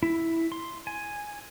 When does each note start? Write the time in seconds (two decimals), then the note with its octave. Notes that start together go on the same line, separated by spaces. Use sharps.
0.03 E4
0.52 C6
0.87 G#5